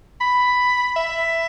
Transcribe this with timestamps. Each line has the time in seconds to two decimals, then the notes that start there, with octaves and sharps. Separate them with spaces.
0.21 B5
0.96 E5